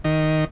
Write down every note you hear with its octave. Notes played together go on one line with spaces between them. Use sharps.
D#3